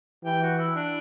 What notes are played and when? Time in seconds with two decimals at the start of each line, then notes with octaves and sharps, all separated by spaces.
0.24 E3 G4
0.42 F#4
0.59 E4
0.76 D4